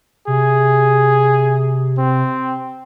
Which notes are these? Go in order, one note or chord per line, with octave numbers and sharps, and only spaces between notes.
C3 G#4
C4